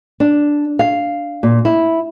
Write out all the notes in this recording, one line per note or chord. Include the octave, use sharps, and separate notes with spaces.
D4
F5
A#2
E4